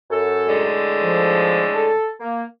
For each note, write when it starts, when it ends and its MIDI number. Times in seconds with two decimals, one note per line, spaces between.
0.11 0.72 42
0.11 0.72 69
0.48 1.90 45
0.48 1.90 50
0.48 1.90 56
1.02 1.64 53
1.74 2.10 69
2.20 2.43 58